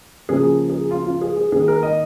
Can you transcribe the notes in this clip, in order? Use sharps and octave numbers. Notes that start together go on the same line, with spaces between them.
C#3 F3 A#3 G#4
G#4
F4
F4
G#4
G#4
D#3 A#3 G#4
A#4
D#5